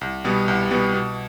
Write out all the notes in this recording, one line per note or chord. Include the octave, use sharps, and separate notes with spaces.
C2
B2 G3 B3
C2
B2 G3 B3
B2